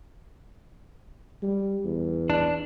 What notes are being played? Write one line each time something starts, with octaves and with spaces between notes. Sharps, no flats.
G3
E2
D4